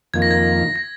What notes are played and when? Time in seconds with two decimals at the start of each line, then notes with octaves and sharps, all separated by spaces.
0.14 F2 D#3 A#3 F4 G#6
0.22 A#6
0.31 G#6
0.76 A#6